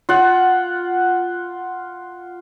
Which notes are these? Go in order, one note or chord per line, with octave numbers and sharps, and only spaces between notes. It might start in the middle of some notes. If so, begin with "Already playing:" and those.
F4 F#5